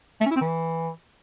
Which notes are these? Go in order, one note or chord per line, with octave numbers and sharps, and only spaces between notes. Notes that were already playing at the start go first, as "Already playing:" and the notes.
A3
C#4
E4
C4
E3